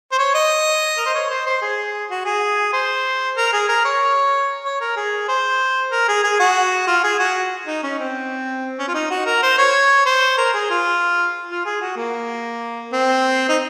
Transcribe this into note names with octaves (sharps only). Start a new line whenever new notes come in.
C5
C#5
D#5
A#4
C5
C#5
C5
C5
G#4
F#4
G#4
C5
A#4
G#4
A#4
C#5
C#5
A#4
G#4
C5
A#4
G#4
G#4
F#4
F4
G#4
F#4
D#4
C#4
C4
C#4
F4
D#4
F#4
A#4
C5
C#5
C5
A#4
G#4
F4
F4
G#4
F#4
A#3
C4
D#4